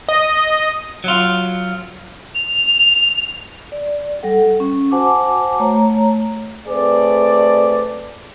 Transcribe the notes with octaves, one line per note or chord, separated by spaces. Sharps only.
D#5
F#3 F4
F7
D5
G3 A4 F#5
C#4
F#4 C5 F#5 G#5 A5 D6
A3 C#5 A#5
A3 C4 G#4 B4 D5